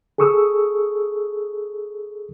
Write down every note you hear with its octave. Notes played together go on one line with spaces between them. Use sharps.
G#4 A4 C#6 D#6 E6